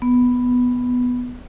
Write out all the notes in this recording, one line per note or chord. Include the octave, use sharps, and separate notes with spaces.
B3